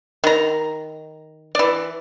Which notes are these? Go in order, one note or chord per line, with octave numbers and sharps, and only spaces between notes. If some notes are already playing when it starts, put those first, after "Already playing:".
D#3 A#5
E3 D5